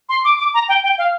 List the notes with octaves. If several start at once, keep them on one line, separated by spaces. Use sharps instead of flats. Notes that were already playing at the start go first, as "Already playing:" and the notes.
C6
D6
D6
A#5
G5
G5
F5